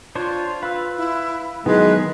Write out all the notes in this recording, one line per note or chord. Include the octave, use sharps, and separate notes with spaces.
D4 F4 C5 C#5
B4 F5 E6
E4
D#3 F#3 G#3 B3 D#4 E4 B4